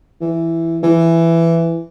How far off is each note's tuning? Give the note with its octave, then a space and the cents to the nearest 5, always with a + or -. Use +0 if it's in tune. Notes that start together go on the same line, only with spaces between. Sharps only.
E3 +5
E3 +10